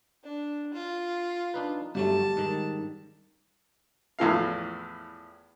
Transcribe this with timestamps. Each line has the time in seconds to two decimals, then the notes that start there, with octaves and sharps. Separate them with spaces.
0.24 D4
0.74 F4
1.54 D4 D#4 B4
1.95 G1 F#3 G3 A3 A5
2.37 G#2 D#3
4.19 E2 A2 F3 F5